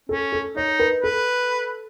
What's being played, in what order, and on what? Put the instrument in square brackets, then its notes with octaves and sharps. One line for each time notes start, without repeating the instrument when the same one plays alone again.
[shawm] C#4 [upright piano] A4
[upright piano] A4
[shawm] D#4 [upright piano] C#5
[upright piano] B4
[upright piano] A4 [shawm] B4